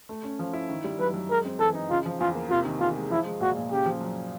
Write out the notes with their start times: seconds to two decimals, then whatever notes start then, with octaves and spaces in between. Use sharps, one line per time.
0.09 A3
0.24 C#4
0.39 F3
0.53 E4
0.69 D#3
0.84 G3
0.99 F#2 B4
1.14 F#2
1.30 G#3 A#4
1.45 C4
1.59 E3 A4
1.75 D#4
1.90 C#3 F4
2.06 F3
2.20 E2 F4
2.35 A#3
2.51 C3 F4
2.65 D#3
2.80 E2 F4
2.96 G#3
3.10 F3 E4
3.25 G#3
3.40 A#2 F#4
3.57 A#2
3.72 C#3 G4
3.86 F3
4.01 F#2